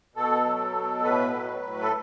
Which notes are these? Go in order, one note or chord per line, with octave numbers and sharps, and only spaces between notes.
B2 A4
F#3
B2
A2 B4
F#3
A2
A4